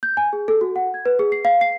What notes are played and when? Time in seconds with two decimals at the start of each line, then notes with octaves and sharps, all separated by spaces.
0.03 G6
0.17 G#5
0.33 G#4
0.48 A4
0.61 F#4
0.76 F#5
0.94 G#6
1.06 B4
1.19 G#4
1.32 C7
1.45 F5
1.61 C7